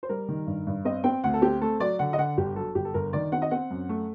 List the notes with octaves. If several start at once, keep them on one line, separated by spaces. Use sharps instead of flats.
C5
G3 A#4
D#3
G2
G2
C4 D#5
C4 G5
D2 F#5
A4
C4 G4
A3 A4
F#3 D5
D3 F#5
D#5
D3 F#5
G1 G4
F#3 A4
G1 G4
A4
G1 A#4
D#3 D5
C4 F#5
D#5
C4 F#5
F#2
A3